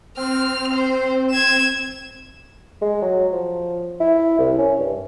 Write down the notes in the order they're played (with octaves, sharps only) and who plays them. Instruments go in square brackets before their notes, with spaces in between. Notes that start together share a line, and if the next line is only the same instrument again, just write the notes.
[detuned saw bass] C4 [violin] F6
[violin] C5
G#6 E7
[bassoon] G#3
F#3
F3
E4
C2
C#4
G2